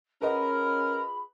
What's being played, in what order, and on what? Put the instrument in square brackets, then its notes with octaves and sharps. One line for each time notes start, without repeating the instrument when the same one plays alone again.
[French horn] C#4 [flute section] F4 G#4 B5 [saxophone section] A#4 [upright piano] B4 D#5 F#5